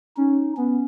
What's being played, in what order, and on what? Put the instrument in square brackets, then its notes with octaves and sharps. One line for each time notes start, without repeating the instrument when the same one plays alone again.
[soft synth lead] C#4 [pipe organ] D#4
[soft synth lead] B3 [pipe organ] C#4